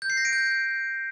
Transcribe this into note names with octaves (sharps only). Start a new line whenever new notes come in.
G6
C7
A#6
D7
G6